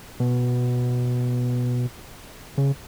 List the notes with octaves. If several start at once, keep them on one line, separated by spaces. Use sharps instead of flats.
B2
C#3